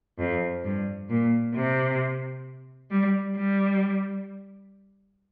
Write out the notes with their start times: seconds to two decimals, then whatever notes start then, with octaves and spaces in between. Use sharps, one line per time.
0.19 F2
0.64 G2
1.09 A#2
1.54 C3
2.90 G3
3.36 G3